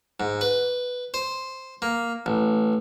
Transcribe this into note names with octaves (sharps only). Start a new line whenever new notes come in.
G#2
B4
C5
A#3
A1